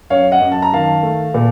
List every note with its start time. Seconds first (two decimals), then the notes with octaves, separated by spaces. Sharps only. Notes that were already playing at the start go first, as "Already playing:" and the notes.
0.10 F#2 C#5 F5
0.32 D#5 F#5
0.41 F#2
0.52 A5
0.62 A#5
0.73 D#3 F5 A5
1.03 A3
1.34 A#2